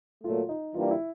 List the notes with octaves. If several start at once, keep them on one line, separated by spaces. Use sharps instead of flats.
A#2 F#3 A3 F4
D#4
E3 G3 A#3 D4 F4
E4